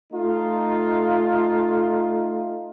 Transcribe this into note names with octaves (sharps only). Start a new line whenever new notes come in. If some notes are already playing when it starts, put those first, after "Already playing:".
A3 D#4 F4